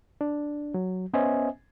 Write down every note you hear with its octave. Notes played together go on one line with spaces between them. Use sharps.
D4
F#3
B3 C#4 C5 D#5 E5 G#5